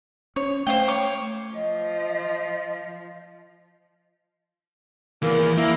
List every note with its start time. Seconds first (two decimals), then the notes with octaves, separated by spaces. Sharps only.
0.36 C#4 C#5
0.67 A3 C5 F5 G5
0.88 C#5 D6
1.55 F3 D#5
5.23 E2 E3 A#3
5.58 A#3 E4